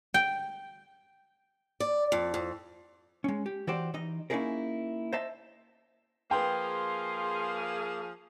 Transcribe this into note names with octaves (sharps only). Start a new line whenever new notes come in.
G5
D5
F2
F2
G#3 C#4
G4
E3 F#4 G4 C5 D5
E3 D#4 D#5
A#3 C#4 D#4 E4 G#4 A#4
C5 D#5 E5 A5
F3 A#3 G#4 B4 G5 C6